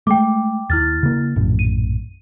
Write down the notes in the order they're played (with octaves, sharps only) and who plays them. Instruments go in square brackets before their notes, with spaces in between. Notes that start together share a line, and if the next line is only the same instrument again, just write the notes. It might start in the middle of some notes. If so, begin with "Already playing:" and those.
[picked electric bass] G#3 A3 [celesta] G5 D6
[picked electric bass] D#2 [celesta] E4 F6 A6
[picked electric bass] C#3 A#3
A#1 F#2 A2
[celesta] D#7